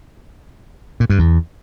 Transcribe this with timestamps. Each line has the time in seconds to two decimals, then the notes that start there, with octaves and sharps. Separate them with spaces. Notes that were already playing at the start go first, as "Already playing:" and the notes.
1.00 A#2
1.10 G2
1.19 E2